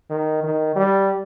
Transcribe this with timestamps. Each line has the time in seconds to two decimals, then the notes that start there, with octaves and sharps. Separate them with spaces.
0.10 D#3
0.43 D#3
0.76 G3